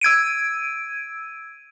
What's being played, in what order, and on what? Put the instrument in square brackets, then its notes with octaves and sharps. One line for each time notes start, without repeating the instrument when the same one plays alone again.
[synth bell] E6 G#6 D7 D#7